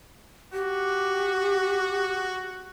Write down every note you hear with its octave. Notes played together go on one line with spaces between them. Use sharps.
F#4 G4